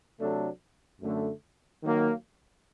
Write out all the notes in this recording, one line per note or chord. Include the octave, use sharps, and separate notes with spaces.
C3 F#3 A3 D4 A4
F#2 D3 A3
D#3 F#3 A#3